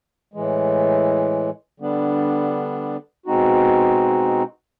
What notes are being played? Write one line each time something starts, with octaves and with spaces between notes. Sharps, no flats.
A2 E3 G#3
D3 G3 B3 D4
B2 G#3 C4 D#4 F#4